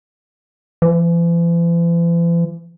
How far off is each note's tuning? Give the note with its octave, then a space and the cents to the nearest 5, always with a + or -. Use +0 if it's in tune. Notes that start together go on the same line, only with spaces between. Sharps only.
E3 +45